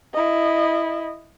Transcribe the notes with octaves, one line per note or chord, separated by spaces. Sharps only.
E4 D#5